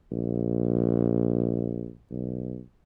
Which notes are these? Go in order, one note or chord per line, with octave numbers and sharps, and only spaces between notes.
A#1
B1